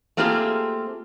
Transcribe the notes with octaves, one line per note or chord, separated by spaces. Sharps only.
A3 A#3 C4 F4 G4 G#4